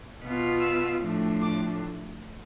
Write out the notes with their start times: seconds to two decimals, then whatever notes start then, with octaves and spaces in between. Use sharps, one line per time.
0.21 B2 B3 F4
0.61 E6
1.01 A2 F3 A3 D4
1.41 D6